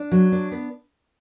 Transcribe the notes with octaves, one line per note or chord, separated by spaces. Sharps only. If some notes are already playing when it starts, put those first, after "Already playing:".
Already playing: D4
F#3
D4
B3